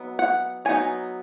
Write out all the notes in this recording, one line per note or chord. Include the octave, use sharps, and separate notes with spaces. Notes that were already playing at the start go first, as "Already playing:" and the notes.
Already playing: F#3 B3 D#4
F#5
F#3 B3 D#4 G#5